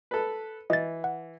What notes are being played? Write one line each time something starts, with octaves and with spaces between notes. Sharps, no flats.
A4 B4
E3 D#5 A6
F#5